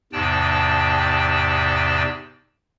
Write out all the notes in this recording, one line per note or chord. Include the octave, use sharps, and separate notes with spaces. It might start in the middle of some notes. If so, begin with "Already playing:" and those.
E2 G#2 C3 D5 G5 A5